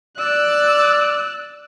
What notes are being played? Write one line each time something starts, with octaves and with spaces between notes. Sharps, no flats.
D5 E6 F#6